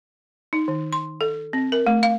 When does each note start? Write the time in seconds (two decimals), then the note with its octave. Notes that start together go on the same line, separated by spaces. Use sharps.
0.53 D#4
0.68 D#3
0.93 C6
1.21 A4
1.53 C4
1.72 A#4
1.87 A3
2.03 F5